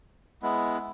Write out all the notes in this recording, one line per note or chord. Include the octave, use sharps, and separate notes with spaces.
G#3 B3 E4